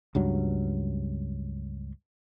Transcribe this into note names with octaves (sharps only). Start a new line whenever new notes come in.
C#2 G2 F#3